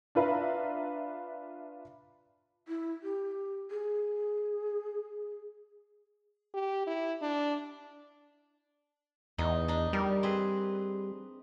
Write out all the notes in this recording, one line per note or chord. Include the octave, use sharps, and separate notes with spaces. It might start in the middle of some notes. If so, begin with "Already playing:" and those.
D4 F4 B4 E5 F5 A#5
E4
G4
G#4
G4
E4
D4
E2 D#4
D4 D#4
G3 A#4
C4 G#4 B4